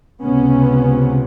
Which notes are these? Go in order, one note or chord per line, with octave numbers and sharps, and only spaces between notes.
C#2 C3 B3 C#4